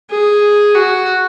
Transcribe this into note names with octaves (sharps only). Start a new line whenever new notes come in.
G#4
F#4